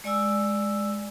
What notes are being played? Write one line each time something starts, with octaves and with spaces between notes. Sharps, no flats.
G#3 D5 G#5 E6